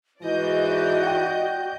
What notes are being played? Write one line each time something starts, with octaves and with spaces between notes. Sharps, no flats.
G#2 E3 F#4 D5 D#5 G6
F#5 G5